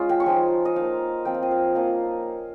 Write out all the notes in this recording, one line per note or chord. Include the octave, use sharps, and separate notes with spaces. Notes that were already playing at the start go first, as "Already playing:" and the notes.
Already playing: G#3 C#4 F4
G5
C#6
F3 G#3 D#4 C6
D#5
A#3 D#4 F5
F3 C4 F4 G5
F5
D#5
F5
F3 A#3 C#4 F4 D#5